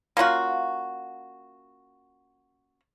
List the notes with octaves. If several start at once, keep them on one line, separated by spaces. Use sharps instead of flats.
A#3 C#4 F4 F#4